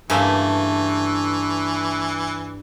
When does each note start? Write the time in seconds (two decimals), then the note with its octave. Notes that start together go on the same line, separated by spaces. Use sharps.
0.10 G2 C#3 E3 A3 A#3